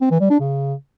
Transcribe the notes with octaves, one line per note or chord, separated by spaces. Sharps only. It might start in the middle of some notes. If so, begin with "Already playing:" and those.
C4
E3
G3
D4
C#3